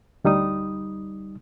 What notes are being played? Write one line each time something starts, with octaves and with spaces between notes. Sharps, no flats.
D2 G3 D#4 D#6